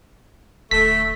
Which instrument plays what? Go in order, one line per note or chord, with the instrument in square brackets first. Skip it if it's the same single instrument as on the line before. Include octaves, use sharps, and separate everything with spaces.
[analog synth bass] D1 [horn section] A3 [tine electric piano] B6